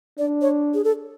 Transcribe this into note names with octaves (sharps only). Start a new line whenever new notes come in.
D4 D5
C#5
G#4
A4